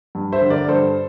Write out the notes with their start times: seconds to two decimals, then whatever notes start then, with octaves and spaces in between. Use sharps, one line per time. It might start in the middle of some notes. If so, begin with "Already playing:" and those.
0.15 G2
0.32 C5 E5
0.41 D3
0.50 A#4 D5
0.68 G2 A4 C5